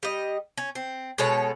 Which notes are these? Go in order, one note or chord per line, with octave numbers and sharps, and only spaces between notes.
G3 D#5
C#4
C4
B2 G#3 A4 C#5